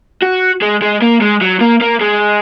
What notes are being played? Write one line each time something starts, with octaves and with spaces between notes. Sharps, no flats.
F#4
G#3
G#3
A#3
G#3
F#3
A#3
A#3
G#3